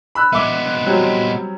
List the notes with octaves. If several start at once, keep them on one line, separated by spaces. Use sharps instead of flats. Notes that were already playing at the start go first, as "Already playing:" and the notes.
B5 E6 F#6
G#3 B3 E5 D6
F#3 G3 C4